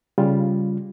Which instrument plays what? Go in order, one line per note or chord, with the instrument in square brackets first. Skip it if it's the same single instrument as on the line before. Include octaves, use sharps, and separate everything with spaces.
[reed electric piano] C#3 G3 F4